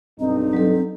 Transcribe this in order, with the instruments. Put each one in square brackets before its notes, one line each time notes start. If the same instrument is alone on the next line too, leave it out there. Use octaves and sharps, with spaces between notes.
[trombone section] B1 G2 D#4 [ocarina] C4
[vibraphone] F#3 A4